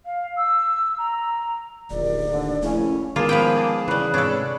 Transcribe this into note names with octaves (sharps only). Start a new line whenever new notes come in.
F5
E6
A#5
D1 A#1 D#2 D5
D#2 D3
A#1 C#3 A3 C#4 E4
D#3 G#3 A#3 B3 F4 G#4 A5
F3 B4 G5
A5 D6
C#3 E3 G3 B4
G#2 C3 D4 A4 C#5 B5